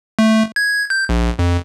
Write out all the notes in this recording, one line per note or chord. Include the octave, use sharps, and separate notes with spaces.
A3
G#6
G6
A#1
F2